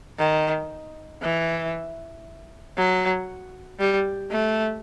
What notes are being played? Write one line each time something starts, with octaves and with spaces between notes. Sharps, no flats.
D#3
E3
F#3
G3
A3